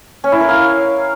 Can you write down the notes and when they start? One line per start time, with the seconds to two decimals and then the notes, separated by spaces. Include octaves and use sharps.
0.24 C#4
0.32 E4
0.40 A#4
0.49 F5